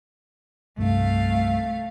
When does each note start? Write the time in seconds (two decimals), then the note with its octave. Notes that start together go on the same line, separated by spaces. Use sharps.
0.78 C2 G2 C3 A3 F5